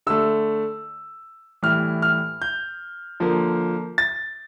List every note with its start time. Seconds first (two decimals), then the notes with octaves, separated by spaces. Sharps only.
0.06 D3 A3 E6
1.63 A2 E3 G3 F6
2.02 F6
2.42 G6
3.20 D3 F3 A#3
3.98 A6